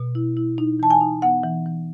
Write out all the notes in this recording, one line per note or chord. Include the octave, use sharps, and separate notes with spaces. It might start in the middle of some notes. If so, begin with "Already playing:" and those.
Already playing: B2
E4
E4
D#4
E3 A5
G#5
D#4
B3 F#5
E3
E3